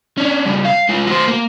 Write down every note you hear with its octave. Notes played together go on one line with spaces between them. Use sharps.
C#4 D4
G2 C#3
F5
G#3 F4
F#3 C5
A#3